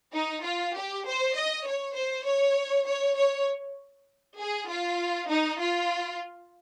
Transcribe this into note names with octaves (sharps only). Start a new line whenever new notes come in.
D#4
F4
G4
C5
D#5
C#5
C5
C#5
C#5
C#5
G#4
F4
D#4
F4